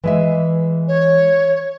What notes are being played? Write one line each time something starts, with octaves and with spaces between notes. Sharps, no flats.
E3 G#3 E5
C#5